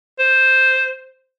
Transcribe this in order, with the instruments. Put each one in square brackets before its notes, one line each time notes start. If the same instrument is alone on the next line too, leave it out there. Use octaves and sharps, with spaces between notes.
[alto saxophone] C5